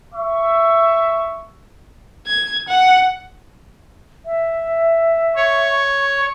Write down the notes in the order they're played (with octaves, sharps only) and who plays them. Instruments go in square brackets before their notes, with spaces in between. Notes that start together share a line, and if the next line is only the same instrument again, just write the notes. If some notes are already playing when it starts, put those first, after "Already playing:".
[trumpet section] E5 C#6
[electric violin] G#6
F#5
[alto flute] E5
[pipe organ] C#5 [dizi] C#6